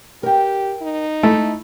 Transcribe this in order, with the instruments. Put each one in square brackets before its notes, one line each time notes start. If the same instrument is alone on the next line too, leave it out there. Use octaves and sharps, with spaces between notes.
[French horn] G4 [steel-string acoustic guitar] A#4 G5
[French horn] D#4
[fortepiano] A3 [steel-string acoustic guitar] E4